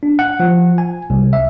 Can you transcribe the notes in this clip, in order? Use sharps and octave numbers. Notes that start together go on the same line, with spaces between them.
D4
F#5
F3
G#5
C2
E5